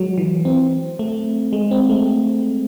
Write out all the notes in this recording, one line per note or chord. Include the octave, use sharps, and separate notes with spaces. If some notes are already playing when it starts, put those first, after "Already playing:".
Already playing: F#3 G#3
E3
C4
A3
G#3
C4
A3